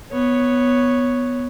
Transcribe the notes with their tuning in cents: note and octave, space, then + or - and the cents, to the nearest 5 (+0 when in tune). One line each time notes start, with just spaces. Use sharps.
B3 +0 C#5 +0